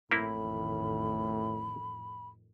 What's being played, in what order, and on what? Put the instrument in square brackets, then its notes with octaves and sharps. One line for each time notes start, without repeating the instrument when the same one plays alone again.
[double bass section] A1 F2 D#3 [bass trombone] A2 [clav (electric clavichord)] A#3 C4 E4 [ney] B5